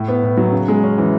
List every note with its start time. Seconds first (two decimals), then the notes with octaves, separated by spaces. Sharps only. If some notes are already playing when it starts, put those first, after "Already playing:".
Already playing: A2
0.08 B3
0.23 A2
0.37 F#3
0.52 C#3
0.68 G#3
0.83 C#4
0.98 E3